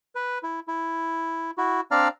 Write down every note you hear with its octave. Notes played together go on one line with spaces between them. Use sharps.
B4
E4
E4
E4 F#4
C4 D4 D5 F5 A#5 F6